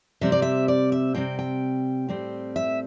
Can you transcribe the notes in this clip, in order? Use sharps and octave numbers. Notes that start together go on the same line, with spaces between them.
C3 G3 C4 E5
D5
E5
D5
E5
C3 G3 C4 G5
G5
A2 G3 C4
E5